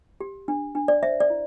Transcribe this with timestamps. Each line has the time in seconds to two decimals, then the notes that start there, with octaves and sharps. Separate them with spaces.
0.20 G4
0.48 D4
0.75 D4
0.88 D5
1.03 C5 E5
1.20 D5
1.30 E4